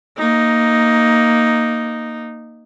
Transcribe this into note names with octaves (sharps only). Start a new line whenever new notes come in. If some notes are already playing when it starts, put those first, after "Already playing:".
A#3 D#4